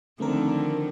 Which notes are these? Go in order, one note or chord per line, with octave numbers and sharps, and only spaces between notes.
D3 D#3 F3 A3 C4 A#4